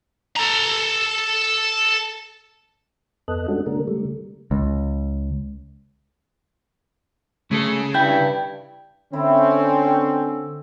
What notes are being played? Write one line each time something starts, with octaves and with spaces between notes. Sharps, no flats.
A4 A#5
F2 B3 A4 D#5 F#6
G3 G#3 C#4 D4 F#4 A4
C#3 G#3 A#3 D4 A#4
C#3 G3 A3
C#2
C#3 A3 G#4 A4
G2 E4 G5 G6
D3 C4 C#4 E4